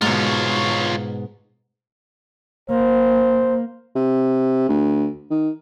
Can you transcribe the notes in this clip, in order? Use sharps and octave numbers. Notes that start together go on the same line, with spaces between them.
G#2 B2 F4 C#5
A#3 C5
C3
D2
D#3